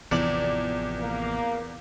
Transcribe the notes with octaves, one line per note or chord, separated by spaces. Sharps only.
A1 E2 C3 F3 D5
A#3